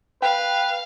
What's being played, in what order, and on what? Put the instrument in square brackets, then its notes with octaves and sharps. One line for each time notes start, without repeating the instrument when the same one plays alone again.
[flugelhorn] B4 [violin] F5 [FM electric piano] G5